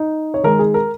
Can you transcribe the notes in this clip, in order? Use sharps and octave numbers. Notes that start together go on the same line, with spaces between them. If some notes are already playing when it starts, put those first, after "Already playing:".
Already playing: D#4
C#5
D#3 G#3 A#4
G#4
A#4